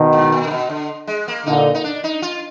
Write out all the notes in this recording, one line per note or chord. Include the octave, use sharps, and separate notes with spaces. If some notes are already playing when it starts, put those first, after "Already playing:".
Already playing: B2 D#3
G#2
A#2
D3
B2
D3
G#3
A#3
A#2 D3 D#4
D#4
D4
D#4
F4